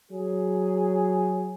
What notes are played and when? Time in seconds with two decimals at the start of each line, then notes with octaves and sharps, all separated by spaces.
0.11 F#3 G#4